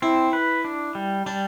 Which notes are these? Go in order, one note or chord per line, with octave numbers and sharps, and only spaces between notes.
C4 E4
B4
D4
G3
G3 D4